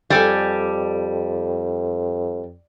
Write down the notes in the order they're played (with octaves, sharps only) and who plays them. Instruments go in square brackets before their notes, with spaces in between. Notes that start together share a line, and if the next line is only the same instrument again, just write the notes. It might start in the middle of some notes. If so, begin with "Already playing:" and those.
[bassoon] F2 [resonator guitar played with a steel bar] G3 [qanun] G4 A4 G#5